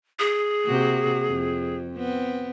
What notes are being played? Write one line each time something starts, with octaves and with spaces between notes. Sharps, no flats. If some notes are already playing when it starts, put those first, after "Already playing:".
G#4
C3 A#3 F#4
F2
B3 C4